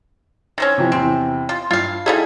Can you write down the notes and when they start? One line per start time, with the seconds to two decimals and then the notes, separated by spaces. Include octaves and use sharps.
0.58 D#3 C4 C#4 A#6
0.78 C3 E3 F3
0.92 E2 C3 C4
1.49 F4
1.71 G2 F4 F5
2.06 G3 D#4 E4 G#4 A4 F5